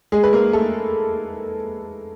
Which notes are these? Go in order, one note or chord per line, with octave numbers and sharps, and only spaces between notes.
G#3 G#4
B4
A#3 A#4
A3 A4